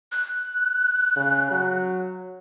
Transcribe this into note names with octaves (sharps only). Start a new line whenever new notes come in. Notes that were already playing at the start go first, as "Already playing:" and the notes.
F#6
C#3
F#3